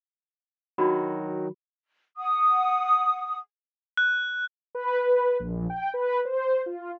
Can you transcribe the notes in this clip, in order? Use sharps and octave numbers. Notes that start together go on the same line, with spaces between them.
D#3 F#3 D4 F#4 B5
F#5 D#6
F#6
B4
A#1
G5
B4
C5
F4